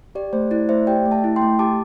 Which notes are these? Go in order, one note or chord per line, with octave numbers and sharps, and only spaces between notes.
G4 D5
A3 C5
E4 D5
A3 C5 E5
G4 D5 G5
A3
E5 A5
E4
G5 C6
A3
G4 A5 D6